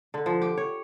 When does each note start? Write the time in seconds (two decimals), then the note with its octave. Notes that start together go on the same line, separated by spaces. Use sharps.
0.14 D3
0.26 F3
0.41 G4
0.57 C#5